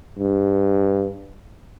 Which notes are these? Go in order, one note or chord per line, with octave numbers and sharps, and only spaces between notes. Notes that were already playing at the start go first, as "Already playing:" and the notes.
G2